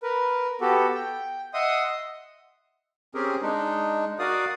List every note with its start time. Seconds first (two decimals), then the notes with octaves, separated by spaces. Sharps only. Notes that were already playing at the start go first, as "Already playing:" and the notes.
0.03 A#4 B4
0.61 B3 F#4 G4 A4
0.94 G5
1.54 D#5 E5 F#5 C6 D#6
3.15 C4 C#4 G4 G#4 A#4
3.42 G#3 D4 D#4
4.19 F#4 A#4 D5 F5 D#6